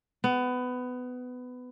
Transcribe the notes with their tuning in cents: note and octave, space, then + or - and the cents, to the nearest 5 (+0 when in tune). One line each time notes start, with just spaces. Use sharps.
B3 +20